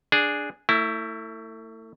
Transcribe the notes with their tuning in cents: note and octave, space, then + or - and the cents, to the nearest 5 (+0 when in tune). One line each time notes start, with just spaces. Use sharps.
D4 +0 G#4 +0
A3 +35 E4 +0